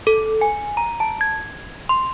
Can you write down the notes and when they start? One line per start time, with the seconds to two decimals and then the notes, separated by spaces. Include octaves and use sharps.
0.07 A4
0.41 G#5
0.77 A#5
1.00 A5
1.21 G#6
1.89 C6